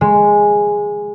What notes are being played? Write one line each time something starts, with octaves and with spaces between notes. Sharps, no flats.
G#3